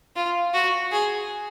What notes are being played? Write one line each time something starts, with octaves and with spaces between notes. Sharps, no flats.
F4
F#4
G#4